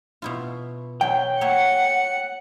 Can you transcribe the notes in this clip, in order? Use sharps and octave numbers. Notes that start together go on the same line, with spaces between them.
B2 E4 F4
F#3 G5
A#3 C#5 E5 F#5 C#7